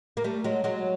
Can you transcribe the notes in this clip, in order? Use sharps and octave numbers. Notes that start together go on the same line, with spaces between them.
A#3
G3 A3
F#3 G#3
F#3 G#3